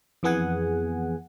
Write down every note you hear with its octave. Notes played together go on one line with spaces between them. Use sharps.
F2 E3 B3 G#4 F#5 G#5